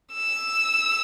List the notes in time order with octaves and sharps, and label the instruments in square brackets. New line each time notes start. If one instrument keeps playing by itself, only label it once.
[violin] E6